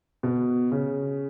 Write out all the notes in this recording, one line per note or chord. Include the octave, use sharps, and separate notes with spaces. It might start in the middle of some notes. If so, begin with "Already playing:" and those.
B2
C#3